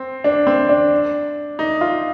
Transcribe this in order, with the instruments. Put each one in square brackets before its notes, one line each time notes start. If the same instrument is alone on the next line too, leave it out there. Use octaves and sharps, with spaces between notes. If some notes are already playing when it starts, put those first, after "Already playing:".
Already playing: [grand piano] C4
D4
C4
D4
D#4
F4